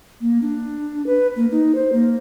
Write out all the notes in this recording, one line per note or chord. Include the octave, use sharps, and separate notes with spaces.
A#3
D4
B4
A#3
D#4
C5
A#3